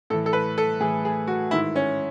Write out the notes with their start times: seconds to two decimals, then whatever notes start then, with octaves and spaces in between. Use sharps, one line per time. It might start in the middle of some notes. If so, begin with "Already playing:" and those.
0.10 A2 A4
0.13 E3
0.26 A4
0.33 B4
0.58 A4
0.80 A2 E3 G#4
1.05 G#4
1.27 F#4
1.51 G#2 D#3 E4
1.76 C#4